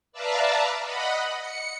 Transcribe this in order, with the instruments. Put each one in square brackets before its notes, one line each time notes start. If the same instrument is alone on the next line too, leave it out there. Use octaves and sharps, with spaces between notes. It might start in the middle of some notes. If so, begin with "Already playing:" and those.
[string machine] B4 D5 E5 F5 A5 A#5
D#5 F#5 B5
C#7